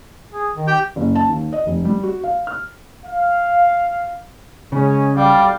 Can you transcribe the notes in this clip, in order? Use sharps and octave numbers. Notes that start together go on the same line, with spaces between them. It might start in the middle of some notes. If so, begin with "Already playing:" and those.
G#4
D#3
G4 G5
F#1
A5
D#2
D#5
F1
G3
F#4
F5
F6
F5
C#3 G#3 C#4
B1 G3 D5 F5